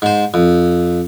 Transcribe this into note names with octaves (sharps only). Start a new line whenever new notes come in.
G#2 C5
F2